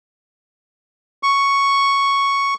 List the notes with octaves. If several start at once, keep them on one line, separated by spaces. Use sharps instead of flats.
C#6